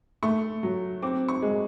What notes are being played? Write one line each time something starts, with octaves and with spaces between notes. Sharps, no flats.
A3 C#6
F#3
C4 D6
C#6
G#3